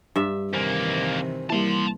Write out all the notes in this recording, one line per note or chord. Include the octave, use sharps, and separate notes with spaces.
G2 E5
F2 C3 D#3 E3 A#3 C5 G#5
G3 A#3 E4 A5 C6